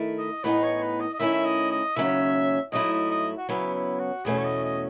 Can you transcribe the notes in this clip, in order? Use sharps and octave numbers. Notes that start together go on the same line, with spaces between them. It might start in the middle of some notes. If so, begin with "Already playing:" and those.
Already playing: D#3 A3 E4
D#5
A2 E3 B3 D#4 G#4 B4
C#5
B4
D#5
D#5
D#3 A3 C#4 E4 E5
E5
D#5
D#5
D#2 C#3 F#3 C#4 E5
G#2 F#3 A3 E4 D#5
D#5
D#5
F#4
C#3 F#3 B3 E4
E4
F#4
E2 B2 A3 C#4 G#4
C#5
D#5
D#5